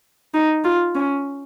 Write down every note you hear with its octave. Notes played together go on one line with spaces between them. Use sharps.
D#4
F4
C#4